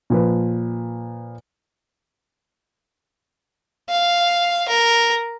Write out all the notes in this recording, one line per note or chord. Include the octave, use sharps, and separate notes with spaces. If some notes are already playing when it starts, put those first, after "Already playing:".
A#2 F3 B4
F5
A#4